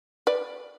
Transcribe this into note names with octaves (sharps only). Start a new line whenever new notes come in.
B4 D5